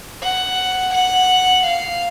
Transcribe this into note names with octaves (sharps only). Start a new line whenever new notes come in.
F#5
F#5
F5